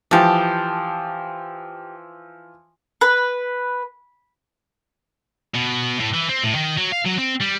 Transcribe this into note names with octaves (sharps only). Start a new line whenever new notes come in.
E3 F3 G4 A5
B4
B2
A2
E3
C4
A2
D#3
F#3
F5
F#3
C4
G3